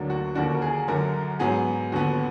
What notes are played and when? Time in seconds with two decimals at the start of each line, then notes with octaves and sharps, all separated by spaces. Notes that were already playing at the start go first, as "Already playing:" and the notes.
Already playing: D2 D3 F#3 A#3 D4
0.10 F#4
0.35 D#2 D3 F3 A#3 D4 F#4
0.54 A#4
0.62 G#4
0.88 F#2 D3 F#3 A#4
1.39 G#2 F#3 B3 G#4
1.92 D#2 D3 F3 B3 F#4